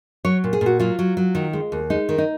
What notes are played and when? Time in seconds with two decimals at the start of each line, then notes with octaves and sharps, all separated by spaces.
0.25 F#3 C#5
0.44 A#2
0.53 G#4
0.61 A#2
0.66 F#4
0.79 F#3 F4
0.99 F#3
1.17 F#3
1.35 D#3
1.53 G#3
1.72 D#2
1.90 G#3 D#4
2.09 D#3
2.18 D#4